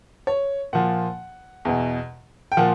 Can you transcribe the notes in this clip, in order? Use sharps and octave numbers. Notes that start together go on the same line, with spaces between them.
C#5
A#2 F3 F#5
E2 B2
G5
A#2 F3 F#5